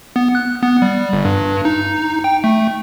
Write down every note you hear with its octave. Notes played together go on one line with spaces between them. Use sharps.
B3
F#6
B3
G3
G1
G2
D#4
G5
A3